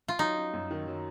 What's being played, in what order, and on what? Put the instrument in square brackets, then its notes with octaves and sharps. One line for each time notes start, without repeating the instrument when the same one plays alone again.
[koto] F4
[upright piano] F#3 [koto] D#4
[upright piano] C#4
F#2
D#3
F#3